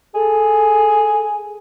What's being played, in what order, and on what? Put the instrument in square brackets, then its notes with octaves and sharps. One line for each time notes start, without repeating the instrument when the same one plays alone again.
[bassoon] G#4 [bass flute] A4